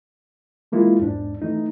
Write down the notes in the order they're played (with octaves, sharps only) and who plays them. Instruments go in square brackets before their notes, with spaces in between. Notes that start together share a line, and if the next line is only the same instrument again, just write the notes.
[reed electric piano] E3 G#3 A#3 E4 F4
E2 G#2 D4
E3 A3 D#4